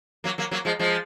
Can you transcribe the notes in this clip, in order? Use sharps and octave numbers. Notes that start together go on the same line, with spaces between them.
F#3 A#3
F#3 A#3
F#3 A#3
F3 G#3
F3 G#3